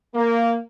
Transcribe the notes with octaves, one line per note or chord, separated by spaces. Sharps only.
A#3